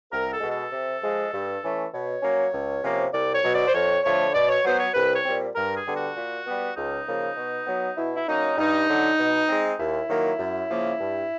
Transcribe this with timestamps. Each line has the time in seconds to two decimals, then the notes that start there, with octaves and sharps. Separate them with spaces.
0.11 C2 A#4
0.31 A4
0.40 B2 G#3
0.50 A4
0.72 C3
1.02 F3 G#3
1.32 G2
1.61 E3 A3 C#4
1.92 B2 C#5
2.22 F#3 A#3 C#4
2.52 C#2
2.83 C3 F3 A#3 C#4
3.13 C2 D5
3.33 C#5
3.43 B2 F#3
3.53 D5
3.67 C5
3.73 F2 C#5
4.03 D3 F3 A3 C#5
4.34 B2 D5
4.48 C#5
4.64 F#3 B3 C5
4.79 C#5
4.94 C2 B4
5.14 C#5
5.25 A#2 G3 C4
5.55 G2 A#4
5.76 G#4
5.85 D3 G3 B3
5.95 F#4
6.15 A#2
6.46 G3 B3
6.76 C#2 D#4
7.06 C#3 F3 A#3
7.36 B2
7.66 F#3 B3
7.97 B2 E4
8.15 E4
8.27 F#3 A#3 C#4 D#4
8.57 G2 D#4
8.87 D3 F#3
9.18 B2
9.47 G#3 C4
9.78 D#2 E4
10.08 D#3 F#3 A#3
10.39 F#2
10.69 C#3 F3 A#3
10.99 G2